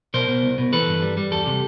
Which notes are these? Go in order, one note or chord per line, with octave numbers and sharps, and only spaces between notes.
B2 A#4 C5
B2
C2
B2
E3 A4 B4
G2
G3
G3
E2 G4 A4
C3